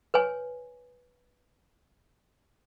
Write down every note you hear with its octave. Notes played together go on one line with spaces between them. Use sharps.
B4 C#5 G#5